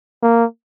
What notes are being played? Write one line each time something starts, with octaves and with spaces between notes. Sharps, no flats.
A#3